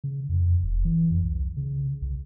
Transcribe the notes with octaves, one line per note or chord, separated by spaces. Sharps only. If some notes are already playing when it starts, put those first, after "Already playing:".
C#3
F2
E1
E3
F2
C2
C#3
C2